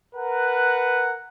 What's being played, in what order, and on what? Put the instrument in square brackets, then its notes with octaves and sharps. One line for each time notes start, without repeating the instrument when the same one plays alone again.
[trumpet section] A#4 B4 F#5